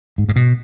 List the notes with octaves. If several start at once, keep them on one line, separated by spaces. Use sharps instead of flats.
G#2
G#2
B2